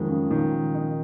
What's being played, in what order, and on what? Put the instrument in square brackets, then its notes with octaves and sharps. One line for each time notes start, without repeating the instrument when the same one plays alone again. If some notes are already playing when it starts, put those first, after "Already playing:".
Already playing: [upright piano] F2 G#3 [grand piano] D#3 F3 F#3
[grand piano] C#3
[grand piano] A#2 [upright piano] D#3
[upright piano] D#4